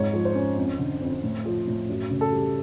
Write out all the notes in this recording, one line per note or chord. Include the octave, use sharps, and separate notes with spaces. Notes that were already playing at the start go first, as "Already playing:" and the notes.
Already playing: F2 G#2 C#5
F3
C5
C#4
F2
D3
F2
A2
F3
A2
F#2
C#3
A4
G3